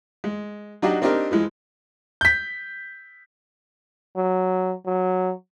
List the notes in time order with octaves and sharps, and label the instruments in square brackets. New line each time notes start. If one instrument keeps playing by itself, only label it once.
[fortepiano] G#3
F#3 D4 D#4 F#4 G4
A#3 C4 D4 D#4 G4 A#4
E3 F3 G#3
[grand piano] G6 B6
[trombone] F#3
F#3